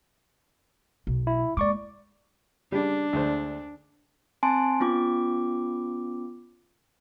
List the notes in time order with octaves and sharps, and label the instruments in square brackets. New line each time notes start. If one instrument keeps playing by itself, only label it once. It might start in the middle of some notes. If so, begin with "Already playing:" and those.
[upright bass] B1
[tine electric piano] E4
[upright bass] D#2 G#3 [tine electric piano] D5 C#6 D6
[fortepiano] C#3 G3 G4 [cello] D4
[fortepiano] D2 G#3 C5
[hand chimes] C4 G#5 A5 C6 D7
B3 C#4 F4 D6